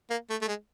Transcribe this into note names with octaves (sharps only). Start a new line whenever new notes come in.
A#3
A3
A3
G#3